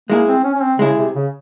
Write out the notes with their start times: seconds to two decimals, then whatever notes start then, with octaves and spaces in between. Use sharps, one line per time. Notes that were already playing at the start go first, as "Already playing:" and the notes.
0.10 G#3 A#3 E4 G#4
0.27 C4
0.44 C#4
0.54 C#4
0.62 C4
0.79 C#3 G#3 E4 G#4
0.97 C3
1.15 C#3